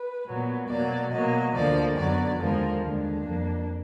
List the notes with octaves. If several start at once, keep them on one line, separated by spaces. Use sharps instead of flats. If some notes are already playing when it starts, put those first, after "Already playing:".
Already playing: B4
A#2 F#3 B3
B2 F#3 A#3 D5
B2 F#3 A#3 D#5
D2 D3 F3 A#3 D5
F#2 D3 F#3 B3 D5
D#2 D3 F3 G#3 A#4
D#2 D3 G#3 D4
F2 F3 A#3